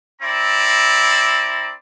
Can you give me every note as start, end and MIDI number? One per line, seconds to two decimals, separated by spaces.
0.22 1.72 60
0.22 1.72 64
0.22 1.72 74
0.22 1.72 82